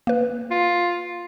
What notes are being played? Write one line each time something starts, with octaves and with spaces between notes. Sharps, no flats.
A#3 B4
F4